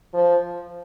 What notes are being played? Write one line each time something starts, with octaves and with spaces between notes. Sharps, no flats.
F3